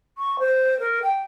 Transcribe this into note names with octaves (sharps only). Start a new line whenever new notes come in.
C#6
C5
A#4
G5